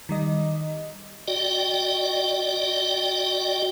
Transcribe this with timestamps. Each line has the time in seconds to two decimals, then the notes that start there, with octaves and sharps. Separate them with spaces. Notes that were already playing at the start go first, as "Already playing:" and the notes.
0.09 D#3 G3 D#5
1.28 F#4 D5 D#5 G5